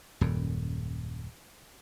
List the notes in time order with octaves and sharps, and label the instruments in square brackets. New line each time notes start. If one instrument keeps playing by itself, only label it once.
[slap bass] D#1 F#2